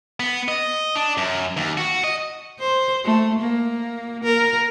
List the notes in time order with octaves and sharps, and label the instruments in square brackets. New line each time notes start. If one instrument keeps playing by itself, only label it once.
[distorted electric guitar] B3
D#5
D4
F#2
D#2
F#4
D#5
[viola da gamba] C5
A3
A#3
A#4